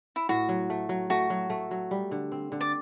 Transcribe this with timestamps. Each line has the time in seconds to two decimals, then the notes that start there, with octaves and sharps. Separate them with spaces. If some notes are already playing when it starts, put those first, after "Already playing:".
0.16 E4
0.29 A2 F#4
0.49 F#3
0.70 A3
0.89 F#3
1.10 A3 F#4
1.30 F#3
1.50 A3
1.71 F#3
1.91 G3
2.11 D3
2.32 C4
2.52 D3
2.61 D5